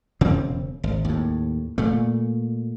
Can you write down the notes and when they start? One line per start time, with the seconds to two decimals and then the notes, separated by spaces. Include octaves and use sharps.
0.21 E1 C#3 C4
0.84 G#1
1.05 D#2 A2
1.78 A#2 A3